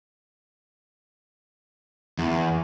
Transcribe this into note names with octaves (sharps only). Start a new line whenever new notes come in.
E2